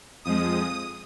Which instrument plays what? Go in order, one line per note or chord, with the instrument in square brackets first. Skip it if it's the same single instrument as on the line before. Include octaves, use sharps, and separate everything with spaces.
[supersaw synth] F2 F3 G#3 D#6